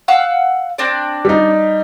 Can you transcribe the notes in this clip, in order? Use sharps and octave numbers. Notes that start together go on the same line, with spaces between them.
F5 F#5 E6
C4 D4 D5
G3 D#4